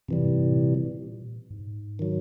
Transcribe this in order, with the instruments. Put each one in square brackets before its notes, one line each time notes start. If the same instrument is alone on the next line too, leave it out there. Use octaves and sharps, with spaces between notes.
[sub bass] G#2 [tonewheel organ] C3 E3 G3
[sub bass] G2
G#2
A2
A#2
G#2
[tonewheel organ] D#3 F#3